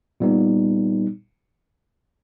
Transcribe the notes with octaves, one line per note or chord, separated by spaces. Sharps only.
A#2 G3 B3 D#4